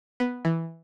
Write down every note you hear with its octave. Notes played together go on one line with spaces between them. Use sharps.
B3
E3